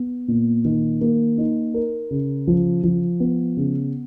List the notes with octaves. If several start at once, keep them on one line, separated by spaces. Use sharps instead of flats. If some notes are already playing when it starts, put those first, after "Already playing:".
Already playing: B3
A#2
D#3
A#3
D#4
A#4
C#3
F3
F3
B3
C#3